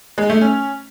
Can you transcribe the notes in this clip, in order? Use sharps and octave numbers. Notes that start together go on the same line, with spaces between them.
G#3
A3
C#4